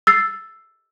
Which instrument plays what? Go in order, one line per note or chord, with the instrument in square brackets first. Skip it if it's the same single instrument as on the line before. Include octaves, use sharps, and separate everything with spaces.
[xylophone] E6 A6 C7